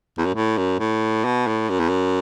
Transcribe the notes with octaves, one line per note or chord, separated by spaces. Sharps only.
E2
F#2
A2
F#2
A2
B2
A2
F#2
E2
F#2